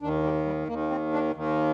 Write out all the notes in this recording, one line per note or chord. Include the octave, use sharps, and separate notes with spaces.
D#2 D#3 D4
G3
G3
D#2 D#3 A#3
C4
D4
D#2 D#3